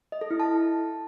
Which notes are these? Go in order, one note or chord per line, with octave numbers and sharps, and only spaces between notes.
D#5
A4
E4
A5